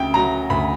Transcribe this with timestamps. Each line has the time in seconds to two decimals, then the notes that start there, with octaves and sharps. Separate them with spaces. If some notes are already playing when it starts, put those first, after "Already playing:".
Already playing: D2 C#3 E5 G5
0.14 F#3 A#5
0.50 D2 B5